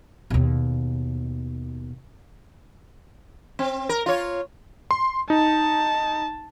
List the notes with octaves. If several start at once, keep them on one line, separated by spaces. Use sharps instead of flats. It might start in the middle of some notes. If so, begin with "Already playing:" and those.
D#2 B2
C4
A#4
F4 C#5
C6
D#4 A5